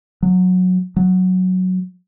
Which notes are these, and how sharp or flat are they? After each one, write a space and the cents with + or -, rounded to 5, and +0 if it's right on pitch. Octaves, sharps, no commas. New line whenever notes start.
F#3 -15
F#3 -5